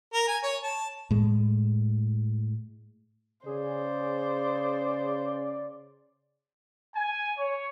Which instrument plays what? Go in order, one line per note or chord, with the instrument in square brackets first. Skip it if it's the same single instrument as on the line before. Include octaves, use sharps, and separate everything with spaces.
[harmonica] A#4
G#5
C#5
A5
[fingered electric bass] A2 G#3
[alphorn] C#3 [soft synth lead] G#4 [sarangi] C5 [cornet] D5
[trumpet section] G#5
C#5